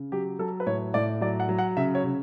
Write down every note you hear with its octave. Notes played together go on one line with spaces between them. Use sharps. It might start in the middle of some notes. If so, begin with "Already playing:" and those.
Already playing: C#3
F#3 G4
F#3 A4
B4
A2 C#5
A2 D5
F#3 D5
F#5
F#3
F#5
C#3 E5
C#5
C#3